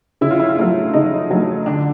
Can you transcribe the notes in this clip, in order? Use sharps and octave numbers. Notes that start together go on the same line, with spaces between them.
C#3 E4
F4
E4
F4
F#3 A3 E4
C#3 D#4
F#3 A3
D3 D4